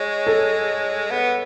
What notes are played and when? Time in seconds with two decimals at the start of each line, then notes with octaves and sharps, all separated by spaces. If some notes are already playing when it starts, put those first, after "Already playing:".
Already playing: G#3 C#5
0.27 A4
1.11 B3